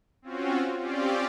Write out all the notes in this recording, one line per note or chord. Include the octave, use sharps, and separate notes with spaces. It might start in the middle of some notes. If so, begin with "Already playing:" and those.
C4 C#4 F4 F#4
C4 C#4 F4 G4 D5